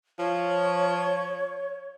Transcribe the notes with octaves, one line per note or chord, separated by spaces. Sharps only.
F3 C#5